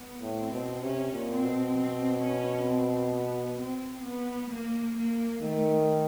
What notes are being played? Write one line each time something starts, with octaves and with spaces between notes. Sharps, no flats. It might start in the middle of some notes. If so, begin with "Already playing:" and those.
Already playing: B3
A2
C4
B2
C3 C#4
A#2
C4
B2
C4
C#4
C4
B3
C4
B3
A#3
A#3
D#3 A3